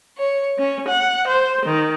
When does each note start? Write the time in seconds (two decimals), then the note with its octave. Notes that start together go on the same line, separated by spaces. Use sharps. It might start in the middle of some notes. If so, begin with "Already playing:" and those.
0.19 C#5
0.58 C#4
0.88 F#5
1.27 C5
1.64 D#3